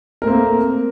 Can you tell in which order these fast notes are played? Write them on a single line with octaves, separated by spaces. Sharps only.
A#4 A3 C4 A#3